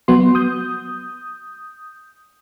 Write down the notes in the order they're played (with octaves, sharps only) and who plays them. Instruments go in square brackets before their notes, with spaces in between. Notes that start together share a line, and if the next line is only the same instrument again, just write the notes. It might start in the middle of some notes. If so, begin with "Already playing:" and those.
[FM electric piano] F#3 B3 F#4 C6
D#6 G6